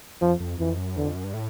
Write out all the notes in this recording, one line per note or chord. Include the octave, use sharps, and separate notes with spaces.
F2 F3
F2
F2 E3
F#2
E2 D3
F2
F#2
G2
A2